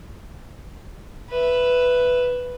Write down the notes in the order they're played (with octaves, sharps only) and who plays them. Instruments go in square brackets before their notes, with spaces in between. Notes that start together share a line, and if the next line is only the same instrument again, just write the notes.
[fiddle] B4 E5